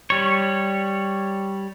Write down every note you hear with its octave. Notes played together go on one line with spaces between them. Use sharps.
G3 C#5